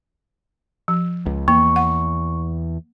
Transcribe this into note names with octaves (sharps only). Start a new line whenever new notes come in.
F3
C#2
E2 A#3 C#6
F#5